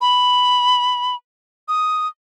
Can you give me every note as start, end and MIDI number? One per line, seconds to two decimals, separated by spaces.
0.01 1.15 83
1.68 2.08 87